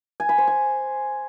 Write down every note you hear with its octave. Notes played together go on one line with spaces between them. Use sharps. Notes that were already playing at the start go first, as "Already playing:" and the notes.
G#5
B5
C5
G#5